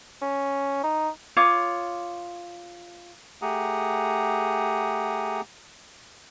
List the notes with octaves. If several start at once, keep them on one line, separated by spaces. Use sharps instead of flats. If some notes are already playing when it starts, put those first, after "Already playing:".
C#4
D#4
F4 C#5 D6 D#6
A3 G4 G#4 F#5 A#5 D#6